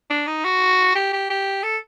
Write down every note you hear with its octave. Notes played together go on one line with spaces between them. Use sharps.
D4
D#4
F#4
G4
G4
G4
A4